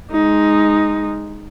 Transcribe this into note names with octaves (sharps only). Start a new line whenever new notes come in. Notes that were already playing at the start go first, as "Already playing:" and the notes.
G#3 D#4